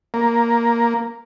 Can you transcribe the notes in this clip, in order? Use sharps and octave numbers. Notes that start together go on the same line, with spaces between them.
A#3